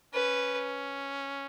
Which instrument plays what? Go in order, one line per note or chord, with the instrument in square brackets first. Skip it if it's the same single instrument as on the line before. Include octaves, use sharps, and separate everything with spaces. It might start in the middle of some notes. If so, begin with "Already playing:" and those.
[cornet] C#4 [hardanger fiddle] B4